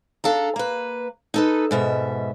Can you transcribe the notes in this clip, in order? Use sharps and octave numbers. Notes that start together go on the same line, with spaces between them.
D4 A4 F5 A#5
A#3 B4
D#4 A4 B4
G#2 B2 E5